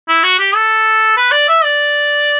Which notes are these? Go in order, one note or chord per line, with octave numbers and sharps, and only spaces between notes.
E4
F#4
G4
A4
B4
D5
E5
D5